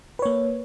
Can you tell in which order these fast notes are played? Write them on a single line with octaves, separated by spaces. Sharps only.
B4 C#5 A#3